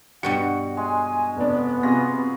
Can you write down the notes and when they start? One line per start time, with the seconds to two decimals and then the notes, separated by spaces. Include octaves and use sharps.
0.23 G2 B2 G3 F#4 F#5 C#7
0.77 G#3 G#5
1.37 F1 B3 D4
1.83 C3 F4 F#4 G#4 A#6